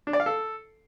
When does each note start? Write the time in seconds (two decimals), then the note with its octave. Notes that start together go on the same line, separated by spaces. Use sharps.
0.07 D4
0.13 D5
0.20 F5
0.26 A4